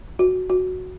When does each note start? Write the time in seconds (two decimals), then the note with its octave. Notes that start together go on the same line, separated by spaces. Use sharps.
0.19 F#4
0.50 F#4